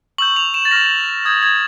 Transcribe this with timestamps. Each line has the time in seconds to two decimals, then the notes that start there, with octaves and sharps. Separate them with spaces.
0.18 C#6 E6 G6 F#7
0.36 F7
0.54 E7
0.65 A6
0.71 C#6 F6 A#6
1.25 D#6 G6 G#6
1.43 G#6